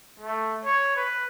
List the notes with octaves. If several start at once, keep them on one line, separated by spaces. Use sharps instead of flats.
A3
C#5
B4